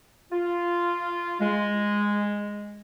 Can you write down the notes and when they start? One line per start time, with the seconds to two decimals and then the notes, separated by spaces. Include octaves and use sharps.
0.32 F4
1.40 G#3